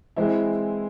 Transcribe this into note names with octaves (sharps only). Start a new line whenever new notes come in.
E3 G#3 C4 E4